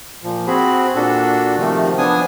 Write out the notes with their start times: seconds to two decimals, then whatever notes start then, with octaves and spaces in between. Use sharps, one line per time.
0.24 A#2 F3
0.47 C4 F#4 G#4 B5
0.95 A#2 D4 F#4 A4
1.58 C3 D#3 F3 A3
1.98 F3 B3 D4 G#5 D#6